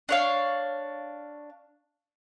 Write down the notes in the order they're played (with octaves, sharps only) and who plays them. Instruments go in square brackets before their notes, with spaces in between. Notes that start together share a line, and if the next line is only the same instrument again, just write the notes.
[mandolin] D4 C#5 F5